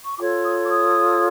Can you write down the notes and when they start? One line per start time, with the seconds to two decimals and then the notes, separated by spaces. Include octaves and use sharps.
0.06 C#6
0.18 F4 A4 C#5 D6
0.45 D#6
0.64 D6
0.71 D#6